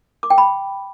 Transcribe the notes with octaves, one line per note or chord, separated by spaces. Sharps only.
D6
G5
B5